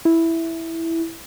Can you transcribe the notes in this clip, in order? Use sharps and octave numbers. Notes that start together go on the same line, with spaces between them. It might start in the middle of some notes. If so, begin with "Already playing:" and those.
E4